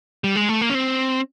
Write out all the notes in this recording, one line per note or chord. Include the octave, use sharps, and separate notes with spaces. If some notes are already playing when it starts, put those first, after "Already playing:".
G3
G#3
A3
A#3
C#4
C4